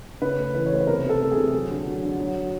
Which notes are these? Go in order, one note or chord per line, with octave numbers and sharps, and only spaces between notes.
C#3 B4
A3
E3 B4
C#5
A3 C5
B4
C3 A#4
C3
A4
A3
G#4
C3
F#3
D3
F#3
D3
F#3